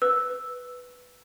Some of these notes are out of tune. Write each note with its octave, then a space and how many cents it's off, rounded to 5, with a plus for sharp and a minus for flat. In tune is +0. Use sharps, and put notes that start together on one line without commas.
B4 +0 E6 +0